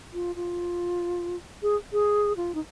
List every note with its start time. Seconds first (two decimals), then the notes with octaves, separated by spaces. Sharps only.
0.14 F4
0.36 F4
1.63 G#4
1.93 G#4
2.37 F4
2.55 D#4